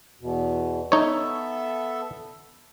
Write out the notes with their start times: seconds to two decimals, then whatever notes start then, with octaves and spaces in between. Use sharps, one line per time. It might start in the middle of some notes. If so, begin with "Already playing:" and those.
0.21 E2 B2
0.92 B3 D#4 A4 C#5 E5